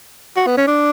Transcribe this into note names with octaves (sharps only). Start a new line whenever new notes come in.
F#4
B3
C#4
D4